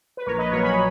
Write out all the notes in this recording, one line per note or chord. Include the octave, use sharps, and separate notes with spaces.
B4
A#1 A#4 C#5
B4 D#5
A#2 F#3 A#4 C#5
G#5 B5